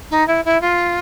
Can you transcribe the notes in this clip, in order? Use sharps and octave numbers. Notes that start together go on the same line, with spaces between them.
D#4
E4
E4
F4